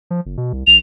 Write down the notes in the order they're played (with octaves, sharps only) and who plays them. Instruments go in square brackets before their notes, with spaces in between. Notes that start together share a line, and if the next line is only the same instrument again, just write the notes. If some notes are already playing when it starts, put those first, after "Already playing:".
[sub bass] F3
F#1
B2
C2
[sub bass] A#1 [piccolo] F7